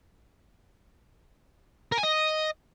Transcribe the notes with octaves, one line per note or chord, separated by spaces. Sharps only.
A#4
G#5
D#5